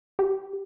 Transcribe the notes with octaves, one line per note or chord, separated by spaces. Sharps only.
G4